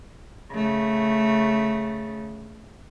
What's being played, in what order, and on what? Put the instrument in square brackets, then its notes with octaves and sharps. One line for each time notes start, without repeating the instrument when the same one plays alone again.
[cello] C#3 A3